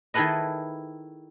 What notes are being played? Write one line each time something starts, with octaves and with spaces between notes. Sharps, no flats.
D#3 E4 G#4 A4 B4 D#5